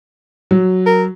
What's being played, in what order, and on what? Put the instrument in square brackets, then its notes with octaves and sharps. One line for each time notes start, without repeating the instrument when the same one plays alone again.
[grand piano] F#3
[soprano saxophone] A#4